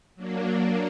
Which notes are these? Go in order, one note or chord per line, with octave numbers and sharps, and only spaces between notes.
F#3 A#3 D4